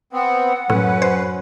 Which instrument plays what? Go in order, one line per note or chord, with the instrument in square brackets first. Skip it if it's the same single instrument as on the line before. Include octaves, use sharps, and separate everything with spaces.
[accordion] B3 C4 [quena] F#5
[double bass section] F#2 C#4 [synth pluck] A2 [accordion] B4
[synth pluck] C5